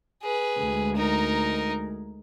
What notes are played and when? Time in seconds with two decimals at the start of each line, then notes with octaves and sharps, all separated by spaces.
0.22 G#4 B4
0.58 D2 G#3
0.96 D#4 A#4